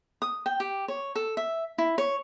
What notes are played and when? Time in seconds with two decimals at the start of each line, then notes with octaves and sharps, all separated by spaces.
0.22 D#6
0.46 G5
0.60 G4
0.88 C#5
1.15 A4
1.37 E5
1.78 E4
1.98 C#5